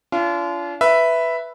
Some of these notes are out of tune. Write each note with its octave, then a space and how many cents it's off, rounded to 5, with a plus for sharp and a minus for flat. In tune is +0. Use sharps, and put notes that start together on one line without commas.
D4 -45 F4 -30
B4 +0 E5 +0